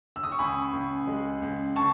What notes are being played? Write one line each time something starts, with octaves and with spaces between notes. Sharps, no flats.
E6
D#6
C#6
C#2 G#5 B5
C#2
G#3
C#2
C#3 A5 C#6